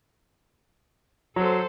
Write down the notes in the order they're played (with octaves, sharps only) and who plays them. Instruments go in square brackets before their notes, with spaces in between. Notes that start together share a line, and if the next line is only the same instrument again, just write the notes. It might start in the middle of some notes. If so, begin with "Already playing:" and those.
[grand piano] F#3 [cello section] A4 C5